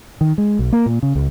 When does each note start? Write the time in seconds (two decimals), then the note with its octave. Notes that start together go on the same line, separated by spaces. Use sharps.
0.21 D#3
0.38 G#3
0.59 B1
0.73 A#3
0.86 A#2
1.03 C#3
1.15 C#2